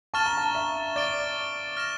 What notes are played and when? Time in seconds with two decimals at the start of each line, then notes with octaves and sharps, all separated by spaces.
0.14 A5 C#6 F6 A6 E7 G7
0.26 A#5
0.37 A5
0.55 E5
0.96 D5 D6 A6 D7 G7
1.77 F6 A#6 E7